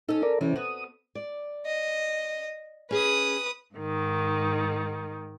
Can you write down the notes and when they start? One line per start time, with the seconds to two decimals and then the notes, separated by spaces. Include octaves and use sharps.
0.09 C#4 D#4 A4
0.23 A#4 D5
0.41 C3 E3 G3 C#4
0.56 B3 F#4 D#6
1.15 D5
1.66 D#5
2.91 C#4 G#4 B4 D#6
3.75 G#2 D#3